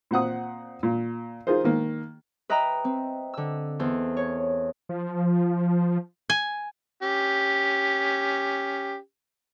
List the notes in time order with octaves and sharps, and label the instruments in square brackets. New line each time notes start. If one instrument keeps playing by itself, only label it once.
[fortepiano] A#2 C4 F#5 D#6
A#2
D#4 F4 G#4 A#4 C5
D#3 A#3
[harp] B4 D#5 E5 G5 A#5
C4
D3 E6
E2 A4 C5
C#5
[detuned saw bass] F3
[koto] G#5
[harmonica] C#4 G4